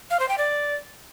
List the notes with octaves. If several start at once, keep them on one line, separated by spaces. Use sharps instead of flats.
F5
C5
G5
D5